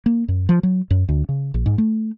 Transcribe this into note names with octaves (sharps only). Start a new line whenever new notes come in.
A#3
F#2
F3
F#3
F#2
D2
C#3
A#1
G#2
A3